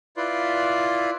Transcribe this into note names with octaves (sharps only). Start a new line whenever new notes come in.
E4 F4 B4 D5 C6